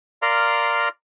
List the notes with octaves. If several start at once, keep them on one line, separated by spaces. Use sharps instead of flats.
A#4 D5 F5 A#5 C6